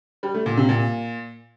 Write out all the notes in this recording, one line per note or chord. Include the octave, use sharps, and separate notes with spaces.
G3
A3
A#2
C3
A#2